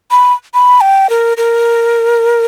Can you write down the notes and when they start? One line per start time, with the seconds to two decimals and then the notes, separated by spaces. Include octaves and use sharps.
0.11 B5
0.54 B5
0.81 G5
1.10 A#4
1.37 A#4